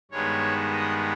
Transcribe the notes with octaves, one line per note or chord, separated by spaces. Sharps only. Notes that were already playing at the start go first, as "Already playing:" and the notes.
G2 D#3 G#3 B3 C#5
D#5